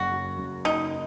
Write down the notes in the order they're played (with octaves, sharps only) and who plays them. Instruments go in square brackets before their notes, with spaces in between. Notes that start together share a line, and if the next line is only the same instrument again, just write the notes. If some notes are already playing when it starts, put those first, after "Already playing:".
Already playing: [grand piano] F#1 F#2 [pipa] F#4
[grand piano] F#3
F#2
[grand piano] F#1 [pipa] D#4